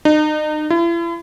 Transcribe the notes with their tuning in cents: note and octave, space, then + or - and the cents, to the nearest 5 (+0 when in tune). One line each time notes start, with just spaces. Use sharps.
D#4 -35
E4 +40